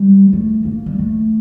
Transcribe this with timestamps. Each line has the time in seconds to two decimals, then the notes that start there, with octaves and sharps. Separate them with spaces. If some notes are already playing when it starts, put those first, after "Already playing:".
Already playing: G3
0.33 A3
0.65 A#3
0.86 G3
0.98 A3